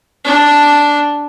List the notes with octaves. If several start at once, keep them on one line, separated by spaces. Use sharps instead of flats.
D4